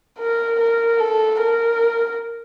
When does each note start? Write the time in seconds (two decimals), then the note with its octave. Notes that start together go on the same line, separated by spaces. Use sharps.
0.19 A#4
0.60 A#4
1.00 A4
1.41 A#4